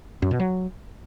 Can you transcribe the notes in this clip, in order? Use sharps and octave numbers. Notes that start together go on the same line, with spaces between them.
F#2
B2
F#3